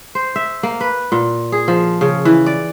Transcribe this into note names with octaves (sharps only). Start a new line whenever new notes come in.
C5
E5
A#3
B4
A#2
G#4
F3
C#3
E3
D5